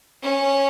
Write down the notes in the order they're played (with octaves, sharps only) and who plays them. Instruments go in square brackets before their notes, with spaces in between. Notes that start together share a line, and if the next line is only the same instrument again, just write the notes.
[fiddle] C#4